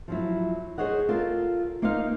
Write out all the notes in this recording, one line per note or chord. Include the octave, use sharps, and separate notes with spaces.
F3 F#3 E4
G#4 C5 C#5 D#5 F#5
F4 A4 A#4
A#3 D#4 C5 D#5 F5